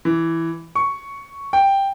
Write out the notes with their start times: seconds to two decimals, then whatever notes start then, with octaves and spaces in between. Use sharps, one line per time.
0.05 E3
0.75 C#6
1.53 G5